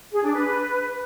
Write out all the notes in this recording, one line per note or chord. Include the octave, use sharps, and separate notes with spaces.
G#4
D4
B4